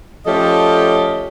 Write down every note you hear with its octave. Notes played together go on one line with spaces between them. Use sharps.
F3 A3 C#4 G4 A4 D#5